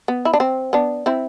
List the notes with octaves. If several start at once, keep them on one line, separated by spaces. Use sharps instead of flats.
B3
E4
D4
C4
B3 D4
C4 E4